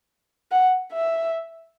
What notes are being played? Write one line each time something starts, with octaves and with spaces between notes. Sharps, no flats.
F#5
E5